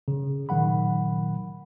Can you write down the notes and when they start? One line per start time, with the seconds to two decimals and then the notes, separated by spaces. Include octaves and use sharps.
0.08 C#3
0.49 A#2 D#3 F#3 F#5 B5